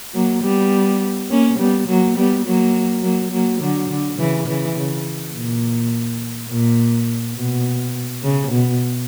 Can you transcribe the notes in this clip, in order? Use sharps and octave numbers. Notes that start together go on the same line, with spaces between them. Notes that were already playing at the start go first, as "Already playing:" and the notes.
F#3 A#3
G3 B3
A#3 C#4
G3 B3
F#3 A#3
G3 B3
F#3 A#3
F#3 A#3
F#3 A#3
D3 F#3
D3
C#3 E3
C#3 E3
C#3
A#2
A#2
B2
C#3
B2